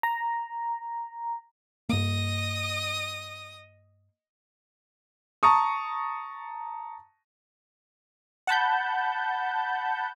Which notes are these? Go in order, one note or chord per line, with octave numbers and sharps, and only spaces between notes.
A#5
G2 A#3 D#5 D#6
A5 A#5 C#6 D#6
F#5 A5 B5 G6